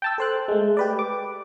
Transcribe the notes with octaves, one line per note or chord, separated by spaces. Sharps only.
G5 A5 E6
A4 C5 F#6
G#3 A3
G4 B4 D5
D6